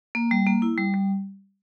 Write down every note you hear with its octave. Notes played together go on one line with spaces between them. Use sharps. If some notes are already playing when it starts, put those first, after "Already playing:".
A#3
G3
A#3
E4
G3
G3